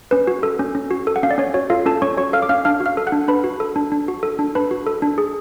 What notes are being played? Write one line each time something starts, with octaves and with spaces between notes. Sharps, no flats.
C#4 B4
F#4
A4
C#4
C#4
F#4
A4
F#5
C#4 F5
D5
C#4 C#5
F#4 C#5
F4 A4 F5
C#4 A4 A5
C#4 C#5 C#6
F#4 C#5 C#6
A4 F5 F6
D6
C#4 F5 F6
D4 F5 F6
F#4
F5 F6
A4
F#5 F#6
D4
D4 B4 B5
F#4
A4
D4
D4
F#4
A4
D4
D4 B4 B5
F#4
A4
D4
G#4